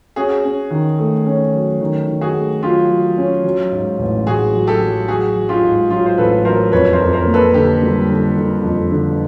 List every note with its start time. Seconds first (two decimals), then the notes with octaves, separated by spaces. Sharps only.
0.16 C#4 F#4 G#4
0.44 C#4
0.71 D#3
0.99 A3
1.26 C#4
1.54 F#3
1.81 D#3
2.08 D#3
2.21 F#4 G#4
2.34 A3
2.62 F#3 F4 G4
2.89 F#3
3.18 C#4
3.44 F#3
3.72 G#2
3.99 A1
4.26 A1 F#4 G#4
4.54 F#3
4.67 G4 A4
4.80 F#3
5.08 F#3 F#4 G#4
5.36 F#3
5.49 F4 G4
5.63 G#2
5.90 F#3 F4
6.06 C5
6.18 A1 A4 B4
6.45 F#3 A#4 C5
6.72 F2 B4 C#5
6.93 A#4 C5
7.00 F2
7.13 A#4 C5
7.27 A#3
7.34 A4 B4
7.54 D3 G4 A4
7.82 G3
8.09 D3
8.37 D3
8.63 F2
8.91 D3